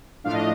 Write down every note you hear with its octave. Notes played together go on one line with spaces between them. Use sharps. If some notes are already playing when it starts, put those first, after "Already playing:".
A2 F3 A3 D4 F5
D#5